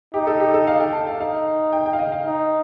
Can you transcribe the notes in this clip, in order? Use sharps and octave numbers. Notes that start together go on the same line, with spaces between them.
D#4 G4
A4
G4
A4
D#5
F5
G5
A5
F5
D#4 F5
G5
G5
F5
D#5
F5
D#4